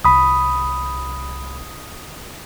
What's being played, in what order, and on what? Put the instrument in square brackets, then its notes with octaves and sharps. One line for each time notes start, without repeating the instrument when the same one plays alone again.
[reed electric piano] C2 B5 [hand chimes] D#6